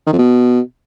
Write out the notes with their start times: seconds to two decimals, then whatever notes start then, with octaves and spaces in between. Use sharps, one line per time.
0.07 D#3
0.13 F2
0.19 B2